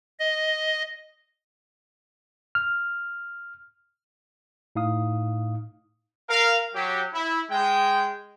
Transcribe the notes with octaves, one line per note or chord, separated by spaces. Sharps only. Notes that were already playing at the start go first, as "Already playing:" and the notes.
D#5
F6
A2 D#4 F5 D#6
A#4 F5
F#3 G4
E4
G#3 G5